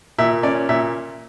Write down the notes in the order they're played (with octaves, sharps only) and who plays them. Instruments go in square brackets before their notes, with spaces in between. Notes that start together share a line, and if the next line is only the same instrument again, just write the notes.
[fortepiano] A#2 E5
C#4 D5
A#2 E5